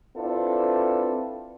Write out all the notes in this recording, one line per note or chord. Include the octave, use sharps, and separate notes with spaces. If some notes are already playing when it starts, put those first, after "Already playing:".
C4 D4 E4 F4 A4 B4